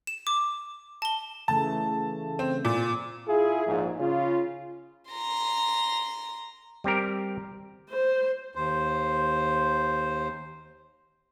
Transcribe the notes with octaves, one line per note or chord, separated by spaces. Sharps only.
E7
D6
A5 G7
C#3 E3 A3 A5
C4
A#2
E4 F4 G#4
A#1 G#2
C#3 F4
A#5 C6
G3 C4 G4 A#4
C5
D#2 C5